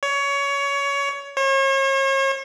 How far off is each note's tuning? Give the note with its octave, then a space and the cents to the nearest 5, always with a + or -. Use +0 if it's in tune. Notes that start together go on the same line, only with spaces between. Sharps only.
C#5 +20
C#5 -40